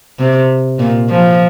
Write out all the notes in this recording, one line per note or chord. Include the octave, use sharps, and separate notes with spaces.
C3
A#2
F3